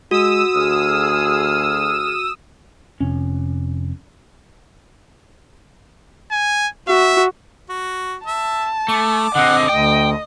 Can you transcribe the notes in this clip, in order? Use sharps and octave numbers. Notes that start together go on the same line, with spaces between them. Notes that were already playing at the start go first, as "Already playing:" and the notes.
G#3 F#4 D#6 E6
D2 G#4 F6
F1 C#4
G#5
F#4 E5
F#4
E5 A5
A3 D6
D3 C4 D#5 F#5
D2 G5